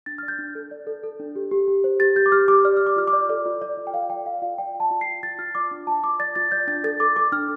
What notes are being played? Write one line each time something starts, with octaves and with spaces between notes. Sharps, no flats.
D4 A6
D5 F6
G6
D4
A4
D5
A4
A4
D4
G4
G4
G4
C5
G4 A6
G4 G6
D6
G4 F6
G4 D6
D5 F6
F6
D5
D6
F4 F6
D6
D5
A4 D5
F4
F4 D5
F4
G5
A4 F5
D5 G5
D5 F5
F4 F5
D5 G5
D5
A5
F4
C7
F4
F4 A6
F4 F6
D5 D6
D4
F4 A5
F4 D6
D5 A6
F4 A6
D5 G6
D4 A6
A4 A6
A4 D6
A4 D6
D4 F6